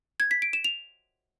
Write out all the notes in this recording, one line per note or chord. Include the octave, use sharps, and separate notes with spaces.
G#6
B6
D7
E7
F7